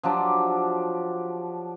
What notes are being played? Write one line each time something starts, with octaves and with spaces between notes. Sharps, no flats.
F3 F#3 D4 G4